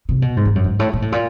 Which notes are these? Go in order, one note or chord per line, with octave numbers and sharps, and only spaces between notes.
C3
B2
G#2
G2
F#2
G#2
A2
A#2
A2
A#2